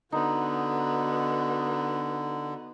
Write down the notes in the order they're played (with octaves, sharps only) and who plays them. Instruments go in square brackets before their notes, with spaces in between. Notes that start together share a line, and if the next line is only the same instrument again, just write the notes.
[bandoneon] D3 [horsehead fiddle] B3 F#4 [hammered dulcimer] D#4